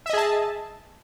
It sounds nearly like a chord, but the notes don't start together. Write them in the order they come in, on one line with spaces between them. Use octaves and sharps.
E5 D#5 G#4 A5